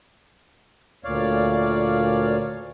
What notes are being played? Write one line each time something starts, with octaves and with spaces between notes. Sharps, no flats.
D2 A#2 C#5 D5 F5